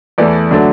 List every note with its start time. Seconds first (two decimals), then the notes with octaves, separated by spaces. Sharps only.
0.18 E2 E3 A3 D5
0.51 D3 F#3 A3